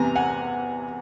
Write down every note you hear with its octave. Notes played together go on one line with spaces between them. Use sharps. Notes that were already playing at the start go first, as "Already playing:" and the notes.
Already playing: E2 C3 E3 G#5 A#5
F#5 G#5